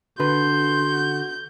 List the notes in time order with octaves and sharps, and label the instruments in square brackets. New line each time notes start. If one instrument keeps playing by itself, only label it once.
[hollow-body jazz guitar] D3 B4 [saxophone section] F#4 [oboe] C6 [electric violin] G6